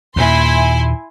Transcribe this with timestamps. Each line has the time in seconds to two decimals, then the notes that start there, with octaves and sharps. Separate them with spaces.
0.16 D#2 A#2 E4 G#5 C6